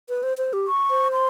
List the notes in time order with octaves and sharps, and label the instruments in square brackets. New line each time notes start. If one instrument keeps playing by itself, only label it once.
[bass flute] B4
C5
C5
G4
[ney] C#6
[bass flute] C5
[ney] C6